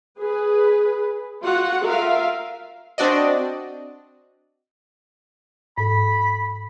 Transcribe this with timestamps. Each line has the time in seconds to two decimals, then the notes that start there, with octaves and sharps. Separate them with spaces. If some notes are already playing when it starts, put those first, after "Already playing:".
0.20 G#4 B4
1.43 F4 F#4 F#5
1.86 F4 A#4 E5 F5
2.98 C4 D4 F#4 D5 D#5
5.78 G#2 A4 B5